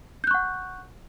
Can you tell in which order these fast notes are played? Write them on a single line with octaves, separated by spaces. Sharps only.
G6 F#6 C#6 F#5